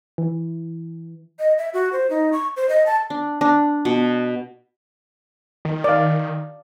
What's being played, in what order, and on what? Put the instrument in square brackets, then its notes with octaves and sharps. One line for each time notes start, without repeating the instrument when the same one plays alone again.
[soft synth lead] E3
[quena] D#5
E5
F#4
C5
D#4
C#6
C5
D#5
A5
[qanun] D4
D4
B2
[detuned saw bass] D#3
[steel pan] D5 F5